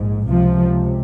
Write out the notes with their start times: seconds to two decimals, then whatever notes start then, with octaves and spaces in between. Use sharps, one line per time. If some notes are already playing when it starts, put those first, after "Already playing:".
Already playing: A#1 G#2
0.30 C#2 C3 F3